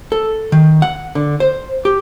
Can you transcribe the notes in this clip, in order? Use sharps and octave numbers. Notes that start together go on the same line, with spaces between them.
A4
D#3
F#5
D3
C5
G4